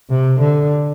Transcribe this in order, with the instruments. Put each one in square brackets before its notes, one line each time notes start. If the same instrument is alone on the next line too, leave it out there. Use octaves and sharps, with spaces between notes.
[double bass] C3
D3